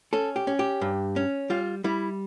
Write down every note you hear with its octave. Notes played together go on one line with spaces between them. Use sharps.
C#4 A4
G4
C#4
G4
G2
C#4
G3 F4
G3 E4